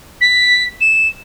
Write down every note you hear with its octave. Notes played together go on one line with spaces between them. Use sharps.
B6
E7